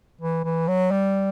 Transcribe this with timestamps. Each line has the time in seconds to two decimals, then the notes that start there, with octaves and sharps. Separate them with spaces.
0.21 E3
0.45 E3
0.68 F#3
0.91 G3